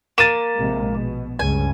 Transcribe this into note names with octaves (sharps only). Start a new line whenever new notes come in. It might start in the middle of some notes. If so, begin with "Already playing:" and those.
A#3 A6 D#7 E7
A#1 C3 G#3
B2
C#2 G2 C#3 G#5